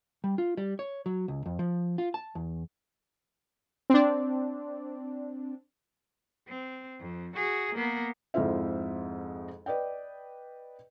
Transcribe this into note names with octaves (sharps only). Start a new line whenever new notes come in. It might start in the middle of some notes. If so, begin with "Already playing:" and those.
G3
F4
G3
C#5
F#3
C#2
F2
F3
F4
A5
E2
C4 D4
C4
F2
F#4 G#4
A#3 B3
F2 G#2 E4 F4 C5 E5
B4 D5 D#5 G5